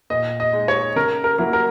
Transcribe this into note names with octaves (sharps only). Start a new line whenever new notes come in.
A#2 D#5
D#5
G#3 D#4
C#5
C#3 A#4
A#4
F#3 A#3 E4
A#4